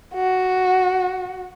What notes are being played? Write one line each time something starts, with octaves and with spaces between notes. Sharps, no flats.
F#4